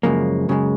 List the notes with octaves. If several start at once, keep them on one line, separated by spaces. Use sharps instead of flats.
F#2 C#3 F3 G#3 A#3
F#2 C#3 F3 G#3